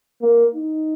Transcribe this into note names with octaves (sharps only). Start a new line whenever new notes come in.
A#3
D#4